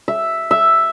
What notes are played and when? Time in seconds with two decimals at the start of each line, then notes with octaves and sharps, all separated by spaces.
0.08 E5
0.51 E5